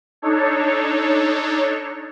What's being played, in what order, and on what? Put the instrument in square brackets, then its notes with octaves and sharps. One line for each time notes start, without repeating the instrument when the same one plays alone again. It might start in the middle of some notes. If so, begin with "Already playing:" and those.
[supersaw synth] D4 D#4 A4 C#5